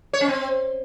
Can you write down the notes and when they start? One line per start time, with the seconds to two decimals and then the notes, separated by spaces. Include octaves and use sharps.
0.13 C#5
0.21 C#4
0.28 C4